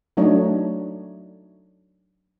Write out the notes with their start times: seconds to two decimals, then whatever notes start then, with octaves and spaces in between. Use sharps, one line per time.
0.17 F#3 A3 D4 D#4 C#5